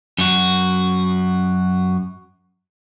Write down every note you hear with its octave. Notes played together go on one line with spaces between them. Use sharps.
F#2 F#4